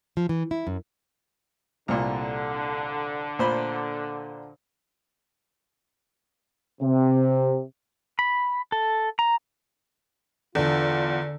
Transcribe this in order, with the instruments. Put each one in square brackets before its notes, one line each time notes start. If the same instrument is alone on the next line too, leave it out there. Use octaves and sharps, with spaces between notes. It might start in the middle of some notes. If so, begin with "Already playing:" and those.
[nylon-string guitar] F3
E3
E4
F#2
[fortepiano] C2 A#2 [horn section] D3
[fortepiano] A#2 C5 B5
[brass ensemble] C3
[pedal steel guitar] B5
A4
A#5
[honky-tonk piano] E2 [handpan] D3 A4 [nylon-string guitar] D4 [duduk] F4